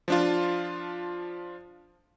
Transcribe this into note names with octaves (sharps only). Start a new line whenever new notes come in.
F3 D4 F4